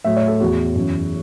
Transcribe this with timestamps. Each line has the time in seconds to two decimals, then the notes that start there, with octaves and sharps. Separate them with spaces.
0.04 A2 F#3 E5
0.17 C#5
0.28 A4
0.40 E2 E3 F#4
0.75 F#2 E3